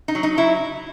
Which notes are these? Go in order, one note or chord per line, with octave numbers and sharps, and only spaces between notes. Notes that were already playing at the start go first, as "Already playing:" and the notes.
D#4
F#3
D#4
F#3 E4